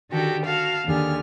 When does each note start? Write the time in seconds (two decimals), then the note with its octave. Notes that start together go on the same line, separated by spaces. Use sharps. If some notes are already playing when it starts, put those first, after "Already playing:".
0.11 D3 D#3 F#4 G4 A4
0.45 F#4 F5 A5
0.86 D#2 D3 D4 G4 G#4 F6